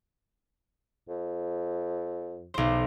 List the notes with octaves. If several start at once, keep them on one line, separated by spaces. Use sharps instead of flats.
F2
B1 C5